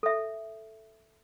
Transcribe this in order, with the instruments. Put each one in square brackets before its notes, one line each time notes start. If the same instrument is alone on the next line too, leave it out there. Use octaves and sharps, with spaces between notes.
[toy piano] A4 E5